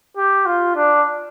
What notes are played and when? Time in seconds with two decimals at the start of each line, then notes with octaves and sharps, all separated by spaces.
0.17 G4
0.46 F4
0.76 D4